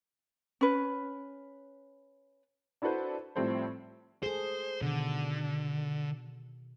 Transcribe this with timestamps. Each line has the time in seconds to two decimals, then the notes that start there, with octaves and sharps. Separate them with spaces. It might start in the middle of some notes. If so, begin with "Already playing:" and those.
0.61 C#4 B4
2.82 D4 E4 F#4 A4 B4 C5
3.36 A2 F3 G3 C4 A4 C5
4.23 G#4 A4 C5
4.82 B2 D3 D#3